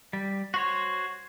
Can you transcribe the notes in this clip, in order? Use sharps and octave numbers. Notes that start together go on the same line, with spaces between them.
G3
F#4 C5 C#5